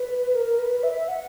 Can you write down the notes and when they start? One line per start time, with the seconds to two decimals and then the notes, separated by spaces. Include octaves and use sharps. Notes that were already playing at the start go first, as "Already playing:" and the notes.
Already playing: B4
0.33 A#4
0.46 A#4
0.59 B4
0.71 B4
0.83 E5
0.96 E5
1.08 F#5